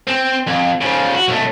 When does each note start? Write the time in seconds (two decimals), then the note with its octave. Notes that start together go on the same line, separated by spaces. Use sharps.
0.08 C4
0.47 F2
0.81 C#3 F3
1.15 F#4
1.28 B1 A3